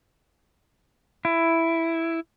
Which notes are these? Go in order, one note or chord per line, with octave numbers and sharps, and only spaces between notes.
E4